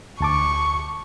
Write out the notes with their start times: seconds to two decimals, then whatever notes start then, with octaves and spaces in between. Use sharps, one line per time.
0.20 D2 A5 C#6 D6